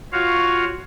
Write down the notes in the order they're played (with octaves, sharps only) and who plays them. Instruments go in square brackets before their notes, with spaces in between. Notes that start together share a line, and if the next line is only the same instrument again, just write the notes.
[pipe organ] F4 F#4 C#5 F5